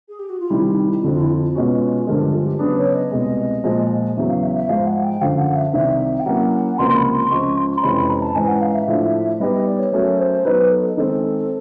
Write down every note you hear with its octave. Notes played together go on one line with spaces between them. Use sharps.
G#4
G4
F#4
F4
C3 D#3 G3 E4
D#4
E4
F2 D3 F3 F#4
F4
E4
F4
B2 G#3 C#4 F#4
G2 D3 F3 G#3 A#4
A4
F4
G4
C#3 F#3 B3 D4 G#4
C#5
D#5
C2 B2 G#3
A#2 F3 G#3
E2 C#3 F#3 E5
F5
E5
E5
G#2 F3 G#3 F5
F#5
G5
F#2 D3 F3 F5
F#5
E5
C2 C3 D#3 E5
G5
F#3 A#3 C#4 E4 F#5
C#2 C3 F3 A#3 C6
C6
B5
C6
C#2 C#3 F3 C#6
C6
A#5
F2 C3 E3 G#3 C#4 B5
B5
A#5
A5
G#2 E3 G#3 C#4 G#5
F#5
F5
E5
A2 F3 A3 D4 F4
G3 B3 D#4 G4 B4 D#5
D#5
D5
C#5
F#3 A3 C#4 F#4 A#4 C#5
C5
F#3 B3 D#4 F#4 B4
A4
D#3 G#3 C4 A4